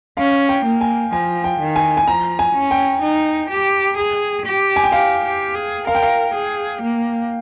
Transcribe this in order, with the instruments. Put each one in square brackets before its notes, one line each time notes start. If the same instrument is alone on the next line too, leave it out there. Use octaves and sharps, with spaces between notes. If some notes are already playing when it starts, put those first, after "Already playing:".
[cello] C#4 [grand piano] F5
[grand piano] G5
[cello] A#3
[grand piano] G#5
[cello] F3 [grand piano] G#5
[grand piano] G5
[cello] D#3
[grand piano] G#5
G#5
[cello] F3 [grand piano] A#5
[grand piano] G#5
[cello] C#4
[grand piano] G5
[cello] D#4
G4
G#4
G4
[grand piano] G#5
G5
[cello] G4 [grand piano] F5
[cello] G4
G#4
[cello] A#4 [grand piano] F5
[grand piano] G5
F5
[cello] G#4
A#3